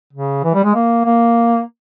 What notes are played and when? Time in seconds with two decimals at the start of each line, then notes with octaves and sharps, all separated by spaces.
0.13 C#3
0.44 E3
0.54 G3
0.64 G#3
0.75 A#3
1.05 A#3